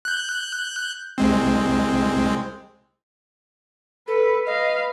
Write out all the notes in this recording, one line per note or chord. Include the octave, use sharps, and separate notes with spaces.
F#6 G6
C2 G#3 C4
A4 B4
B4 D#5 F5